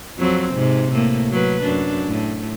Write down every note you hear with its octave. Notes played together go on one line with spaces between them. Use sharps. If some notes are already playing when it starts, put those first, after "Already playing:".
F2 F#3 C4
G#2 C3
A2 A#3
F#3 B4
F#2 D4
A2